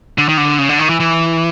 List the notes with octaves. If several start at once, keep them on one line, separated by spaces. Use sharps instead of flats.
D3
D#3
D3
C#3
D3
D#3
E3
E3